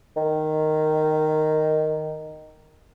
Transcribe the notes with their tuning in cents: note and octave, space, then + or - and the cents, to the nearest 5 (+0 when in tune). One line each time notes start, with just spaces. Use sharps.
D#3 -5